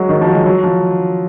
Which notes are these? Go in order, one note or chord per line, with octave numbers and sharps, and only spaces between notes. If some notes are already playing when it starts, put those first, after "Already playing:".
Already playing: F#3 G#3
D#3
F3
F#3
G#3
F#3
F3